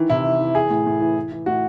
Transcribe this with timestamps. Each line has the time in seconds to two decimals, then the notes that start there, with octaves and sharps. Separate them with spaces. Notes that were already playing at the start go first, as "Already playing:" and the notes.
Already playing: D#3 E3
0.10 C3 E4
0.24 E3
0.40 E3
0.55 E3 G#4
0.70 A2
0.86 A2
1.00 E3
1.16 E3
1.32 E3
1.46 A2 F#4